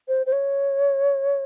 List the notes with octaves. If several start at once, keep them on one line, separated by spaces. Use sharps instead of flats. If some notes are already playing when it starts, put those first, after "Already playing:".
C5
C5
C#5